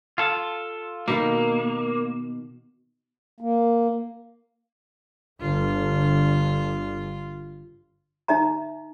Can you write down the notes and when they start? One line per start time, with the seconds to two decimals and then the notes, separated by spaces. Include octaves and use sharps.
0.18 F4 A4
1.08 B2 D#3 A#3 F5
3.41 A#3
5.41 G1 D3 F4
8.28 D#4 D#5 E5 A#5